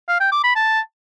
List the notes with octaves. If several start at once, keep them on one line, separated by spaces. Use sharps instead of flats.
F5
G5
D6
B5
A5